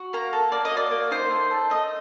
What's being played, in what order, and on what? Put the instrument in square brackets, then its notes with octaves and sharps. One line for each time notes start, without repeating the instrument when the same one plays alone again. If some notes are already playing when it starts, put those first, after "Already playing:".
Already playing: [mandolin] F#4
A#3 A#5
A4
A#3 D5
D#5
F#4
D5
A#3
D#4 C5
A3
A4
A3 D#5